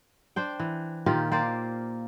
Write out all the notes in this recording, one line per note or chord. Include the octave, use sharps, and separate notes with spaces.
D4 C5 G5
E3
A#2 D#3 F4 G4
A#3 C5 D5